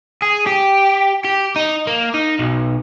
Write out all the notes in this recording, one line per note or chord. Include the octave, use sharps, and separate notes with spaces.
G#4
G4
G4
D#4
A#3
D#4
B1